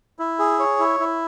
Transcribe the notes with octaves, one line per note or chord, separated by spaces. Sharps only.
E4
G#4
C#5
E4
E4